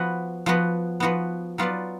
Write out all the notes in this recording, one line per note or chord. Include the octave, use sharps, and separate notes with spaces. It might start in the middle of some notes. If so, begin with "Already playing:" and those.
Already playing: F3 B3 F#4 B4
F3 B3 F#4 B4
F3 B3 F#4 B4
F#3 B3 F4 B4 D5